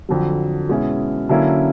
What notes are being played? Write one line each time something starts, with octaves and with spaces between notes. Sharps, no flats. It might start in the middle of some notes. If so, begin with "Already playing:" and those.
F2 D3 F#3
B2 G#3 C#4 E4
D3 F#3 A#3 C#4 E4